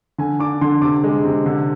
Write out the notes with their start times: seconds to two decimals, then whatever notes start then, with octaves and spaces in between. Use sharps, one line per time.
0.18 D3 G#5
0.40 D4 D6
0.61 D3 C6
0.82 C3 D6
1.04 G#3
1.25 C3
1.46 D3